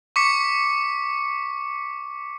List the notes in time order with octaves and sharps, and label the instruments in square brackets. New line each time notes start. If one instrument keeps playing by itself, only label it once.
[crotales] C#6 D6 B6 C#7